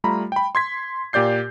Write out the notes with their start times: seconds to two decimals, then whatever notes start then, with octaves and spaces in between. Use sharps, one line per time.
0.04 G3 A3 F4 A#5 B5
0.32 G5 B5
0.55 C6 G#6 B6
1.13 A#2 G4 D5 G6 C7